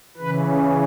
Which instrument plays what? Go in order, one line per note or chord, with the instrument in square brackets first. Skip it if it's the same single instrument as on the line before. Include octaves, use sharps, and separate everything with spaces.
[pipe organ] C#3 E3 B4